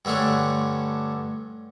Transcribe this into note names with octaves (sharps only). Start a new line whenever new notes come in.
G2 D3 A3 C#4 D4